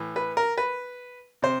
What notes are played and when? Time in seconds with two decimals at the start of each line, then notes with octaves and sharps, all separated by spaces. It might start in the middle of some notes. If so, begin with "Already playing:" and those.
Already playing: A2 E3
0.16 B4
0.37 A#4
0.58 B4
1.42 C3 C5